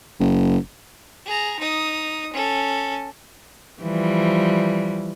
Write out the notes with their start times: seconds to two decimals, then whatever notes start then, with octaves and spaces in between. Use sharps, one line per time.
0.20 F#1
1.25 G#4 A#5
1.60 D#4 D#6
2.33 C#4 A4
3.82 E3 F3 G3